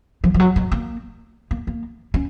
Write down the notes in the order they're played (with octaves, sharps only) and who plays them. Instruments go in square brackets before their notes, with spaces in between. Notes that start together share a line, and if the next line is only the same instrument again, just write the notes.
[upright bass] F3
F3
F#3
G#3
A#3
A#3
A#3
C#4